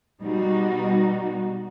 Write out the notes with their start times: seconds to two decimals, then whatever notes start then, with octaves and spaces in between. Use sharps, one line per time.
0.21 B2 G3 D#4 F#4